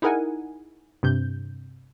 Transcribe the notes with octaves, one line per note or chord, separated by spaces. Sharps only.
D#4 E4 G#4 A#4 F#5 G#5
G2 C3 G6